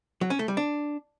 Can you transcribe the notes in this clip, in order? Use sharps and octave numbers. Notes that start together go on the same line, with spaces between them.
F#3
C#4
A3
G3
D4